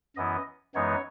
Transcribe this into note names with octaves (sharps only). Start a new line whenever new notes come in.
F#2 E3 B3 E4 D#5
F#2 E3 G#3 B3 D#4 C#5